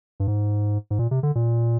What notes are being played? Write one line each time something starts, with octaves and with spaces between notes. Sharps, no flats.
G2
G#2
G#2
A#2
C3
D3
A#2